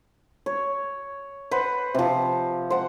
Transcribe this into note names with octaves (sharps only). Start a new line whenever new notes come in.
C#5
B4 C5 F#5
C3 F3
C5 F#5